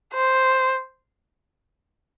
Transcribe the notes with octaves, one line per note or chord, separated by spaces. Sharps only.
C5